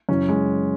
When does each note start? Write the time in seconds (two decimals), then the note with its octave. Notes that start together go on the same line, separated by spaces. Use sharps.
0.09 F#2 C#3 E3 C#4
0.29 G#3